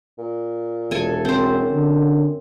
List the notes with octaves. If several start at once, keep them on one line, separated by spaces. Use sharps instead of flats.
A#2
E1 A4 G#5
F#2 C4 C5
D3